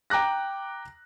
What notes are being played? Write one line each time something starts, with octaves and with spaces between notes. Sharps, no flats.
G5 A#5 D6 F#6 A#6